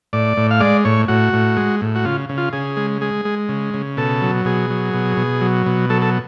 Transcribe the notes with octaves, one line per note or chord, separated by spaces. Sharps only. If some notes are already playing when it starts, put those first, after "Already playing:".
A2 D5
A2
F5
G#3 D5
A2 C#5
A2 F#4
A2
G#3
A2
F#4
C#3 F4
C#3
F4
C#3 G#4
G#3
G#3 G#4
G#3
C#3
C#3
B2 A4
F#3
B2 G#4
F#3
B2
B2
F#3
B2
F#3 A4
A4